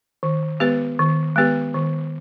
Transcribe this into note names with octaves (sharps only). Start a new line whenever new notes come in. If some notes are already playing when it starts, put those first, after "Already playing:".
D#3
G#3 B3 G4 B4
D#3
G#3 B3 G4 B4
D#3